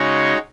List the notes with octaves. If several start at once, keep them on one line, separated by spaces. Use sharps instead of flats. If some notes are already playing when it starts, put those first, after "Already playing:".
Already playing: C#3 G#3 D#4 F#4 C#5